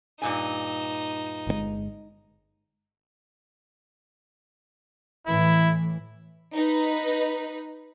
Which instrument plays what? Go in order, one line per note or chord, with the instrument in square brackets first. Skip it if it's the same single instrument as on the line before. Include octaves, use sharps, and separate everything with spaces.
[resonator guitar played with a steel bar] G2 A#2 G#5 [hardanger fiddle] D#4
[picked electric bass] G1 C3 G#3
[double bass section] A2 E3 [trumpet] E4
[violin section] D#4 B4